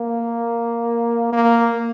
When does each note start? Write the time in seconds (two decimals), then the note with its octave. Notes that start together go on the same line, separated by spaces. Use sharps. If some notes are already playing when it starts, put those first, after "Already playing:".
Already playing: A#3
1.32 A#3